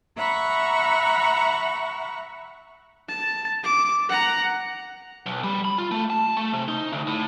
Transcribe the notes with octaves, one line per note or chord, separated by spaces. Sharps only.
E5 F#5 A#5 B5 C#6
A5
D6
F#5 A#5
B1
G3
B5
F4
A3
A5
A3
C3
D#4
D2
A2